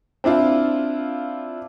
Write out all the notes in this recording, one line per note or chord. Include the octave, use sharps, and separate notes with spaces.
C4 D4 E4 F4